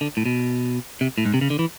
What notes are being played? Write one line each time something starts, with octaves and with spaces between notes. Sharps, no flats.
D3
A2
B2
C3
A2
G#2
C3
C#3
D3
E3